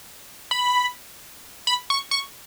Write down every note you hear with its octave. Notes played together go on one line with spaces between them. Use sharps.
B5
B5
C#6
C#6